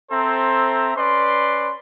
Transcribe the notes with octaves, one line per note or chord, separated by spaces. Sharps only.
C4 A4 C5 E5 A#5
C#4 B4 D5 C6